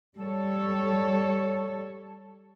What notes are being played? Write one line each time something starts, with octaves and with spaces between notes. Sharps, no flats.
G3 A4 C#5